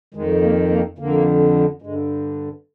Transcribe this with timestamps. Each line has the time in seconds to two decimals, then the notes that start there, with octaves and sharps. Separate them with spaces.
0.14 F2 D#3 G#3
0.42 A#3
0.70 A#3
0.98 F2 D3 A#3
1.82 G2 D3 G#3